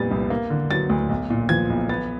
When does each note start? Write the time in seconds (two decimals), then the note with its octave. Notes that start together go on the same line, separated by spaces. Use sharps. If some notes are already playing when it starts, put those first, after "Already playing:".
Already playing: F2 A#2 G3 B3 A6
0.11 C2
0.30 A#3
0.50 D3
0.71 F#3 A6
0.90 D2
1.09 B1
1.30 A#2
1.49 F3 G#6
1.70 B1
1.89 B3 A6